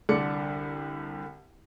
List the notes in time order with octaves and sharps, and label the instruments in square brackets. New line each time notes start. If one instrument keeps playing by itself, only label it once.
[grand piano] C2 D3 D5 C#7